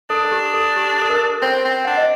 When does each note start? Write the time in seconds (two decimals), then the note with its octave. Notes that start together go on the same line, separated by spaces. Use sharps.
0.10 D4 A4
0.25 A4
0.32 G4
0.53 A4
0.77 G4
1.02 A4
1.10 A#4
1.42 C4 C5
1.65 C4
1.85 D4 F#5
1.97 D#5